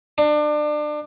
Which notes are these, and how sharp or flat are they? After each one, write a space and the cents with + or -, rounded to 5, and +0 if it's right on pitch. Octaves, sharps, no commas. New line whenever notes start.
D4 +30